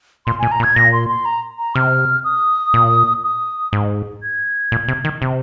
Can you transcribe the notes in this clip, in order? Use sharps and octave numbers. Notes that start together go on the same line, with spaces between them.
A#2 C6
A#2 G#5
A#5
A#2
G#6
A#2 A#6
C6
C6
A#5
A#5
C3 F6
D#6
A#2
D#6
G#2
G#6
A#2
C3
D#3
C3